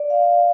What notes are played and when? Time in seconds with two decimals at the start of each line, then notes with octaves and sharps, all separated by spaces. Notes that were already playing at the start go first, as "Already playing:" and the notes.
Already playing: D5
0.10 F5